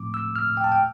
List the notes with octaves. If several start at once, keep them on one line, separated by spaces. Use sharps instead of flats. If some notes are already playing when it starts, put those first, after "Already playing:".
Already playing: A2 F3 A3 C4 D6
E6
F6
G5
A5
G5